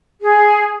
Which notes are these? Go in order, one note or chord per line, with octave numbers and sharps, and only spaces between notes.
G#4